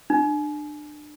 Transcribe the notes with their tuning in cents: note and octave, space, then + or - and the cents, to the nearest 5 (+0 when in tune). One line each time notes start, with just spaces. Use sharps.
D4 +30